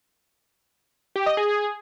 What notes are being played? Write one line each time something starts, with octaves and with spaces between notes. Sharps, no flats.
G4
D#5
G#4